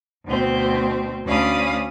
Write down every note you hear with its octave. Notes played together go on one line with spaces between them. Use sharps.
D2 B2 C4
D2 C#4 D5 F5 B5 D#6